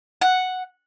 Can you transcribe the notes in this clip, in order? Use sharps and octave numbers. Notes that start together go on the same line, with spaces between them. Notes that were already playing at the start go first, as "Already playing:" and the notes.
F#5